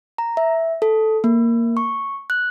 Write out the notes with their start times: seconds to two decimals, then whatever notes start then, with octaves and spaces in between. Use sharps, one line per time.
0.18 A#5
0.37 E5
0.82 A4
1.24 A#3
1.77 C#6
2.30 F#6